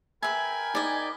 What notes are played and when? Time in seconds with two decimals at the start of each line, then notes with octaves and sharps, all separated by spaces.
0.23 A#4 B4 E5 G5 G#5 B5
0.75 D#4 D5 D#5